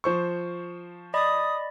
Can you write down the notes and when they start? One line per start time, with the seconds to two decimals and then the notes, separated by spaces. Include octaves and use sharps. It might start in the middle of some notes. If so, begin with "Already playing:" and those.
0.04 F3 C5 C#6
1.14 D5 D#5 B5 D#6